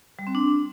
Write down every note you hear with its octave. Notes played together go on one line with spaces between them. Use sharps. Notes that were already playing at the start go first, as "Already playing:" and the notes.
G3
C4
D4